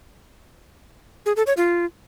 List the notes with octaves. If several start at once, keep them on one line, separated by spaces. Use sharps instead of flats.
G#4
A4
C#5
F4